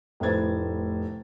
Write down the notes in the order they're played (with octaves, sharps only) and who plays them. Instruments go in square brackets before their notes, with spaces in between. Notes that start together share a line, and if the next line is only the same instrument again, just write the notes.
[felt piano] F1 A2 B4 C5 G#6 A6